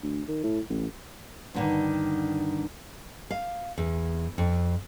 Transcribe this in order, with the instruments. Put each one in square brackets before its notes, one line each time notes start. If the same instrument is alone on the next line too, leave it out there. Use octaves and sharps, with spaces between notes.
[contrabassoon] D2
D#3
A2
A1
[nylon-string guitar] G2 D3 D#3
F5
E2
F2